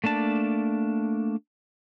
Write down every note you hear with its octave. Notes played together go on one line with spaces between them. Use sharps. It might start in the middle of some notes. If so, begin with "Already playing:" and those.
A3 A#3 D4 A5